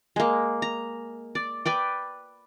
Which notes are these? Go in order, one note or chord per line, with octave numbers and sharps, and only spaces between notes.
G#3 A#3
A#5
D5
B4 D5 G5